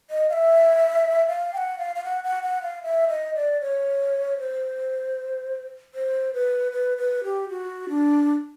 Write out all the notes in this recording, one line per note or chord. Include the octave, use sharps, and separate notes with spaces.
D#5
F5
E5
F5
G5
F#5
F5
F5
F#5
F#5
F#5
F5
E5
D#5
D5
C#5
C5
C5
B4
B4
B4
G4
F#4
D4